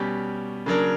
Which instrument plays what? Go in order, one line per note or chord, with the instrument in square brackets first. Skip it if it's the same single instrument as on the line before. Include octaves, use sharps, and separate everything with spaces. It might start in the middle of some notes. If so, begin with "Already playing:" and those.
Already playing: [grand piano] B2 G3 C#4 G4
C#3 F#3 A#3 D4 A#4